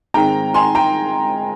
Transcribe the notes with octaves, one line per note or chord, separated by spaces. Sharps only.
G#2 D#3 G#3 C4 G5 A#5
G#5 C6
G5 A#5